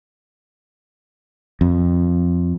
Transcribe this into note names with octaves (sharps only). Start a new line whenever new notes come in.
F2